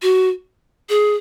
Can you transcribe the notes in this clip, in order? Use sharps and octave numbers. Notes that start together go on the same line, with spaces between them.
F#4
G#4